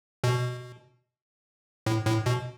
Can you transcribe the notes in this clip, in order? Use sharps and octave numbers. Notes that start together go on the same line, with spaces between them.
B2
A2
A2
B2